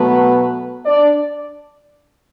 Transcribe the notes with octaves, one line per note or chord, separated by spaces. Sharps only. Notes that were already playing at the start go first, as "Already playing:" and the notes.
Already playing: B2 F#3 A3 B3 B4
D4 D5